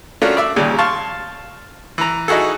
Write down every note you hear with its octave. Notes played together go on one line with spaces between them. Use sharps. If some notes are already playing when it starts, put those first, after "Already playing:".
A3 C#4 D4 F4 F#4 A#4
D5 E5
D#2 A#2 C#3 G3
F5 A5 C6 C#6
E3 A#5
D#4 E4 F#4 G#4 A4